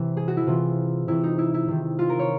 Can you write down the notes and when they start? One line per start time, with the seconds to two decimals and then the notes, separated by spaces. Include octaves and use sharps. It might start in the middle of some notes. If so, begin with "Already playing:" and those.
Already playing: C3 E3
0.17 G#4
0.28 F#4
0.37 E4
0.47 C3 E3 F4
1.08 C3 E3 E4
1.23 D#4
1.38 E4
1.54 E4
1.68 C3 D#3
1.99 F4
2.09 A#4
2.19 C#5